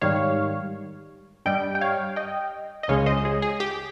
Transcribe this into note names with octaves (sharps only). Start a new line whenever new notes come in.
G#2 D#3 G3 C#5 F5
G2 G3 D#5 G5
G5
C#5 F5
D#5 G5
D#5
C#2 C#3 G#3 C#5 F5
C5 D#5
G#4
G#4
G4